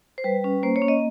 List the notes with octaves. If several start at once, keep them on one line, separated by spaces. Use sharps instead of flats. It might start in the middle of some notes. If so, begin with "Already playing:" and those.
C5
G3 B4
C#4
A#3 C5
C#5
C#4
D#5